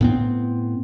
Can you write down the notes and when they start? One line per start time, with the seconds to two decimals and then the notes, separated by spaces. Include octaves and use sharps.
0.01 A2 B3 C4